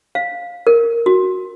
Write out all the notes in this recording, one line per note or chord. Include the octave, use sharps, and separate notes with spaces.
F5
A#4
F#4